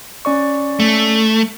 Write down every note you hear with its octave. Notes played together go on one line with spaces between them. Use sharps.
C#4 D5 C#6
A3